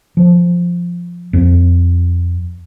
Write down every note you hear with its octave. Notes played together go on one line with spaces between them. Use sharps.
F3
F2